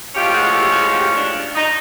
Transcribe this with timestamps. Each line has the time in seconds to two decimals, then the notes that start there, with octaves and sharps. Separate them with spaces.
0.15 A2 F3 G#3 C#4 F4 G4
0.34 F#4 G#4
0.53 G4 A4
0.72 F#4 G#4
0.91 F4 G4
1.17 D4
1.55 D#4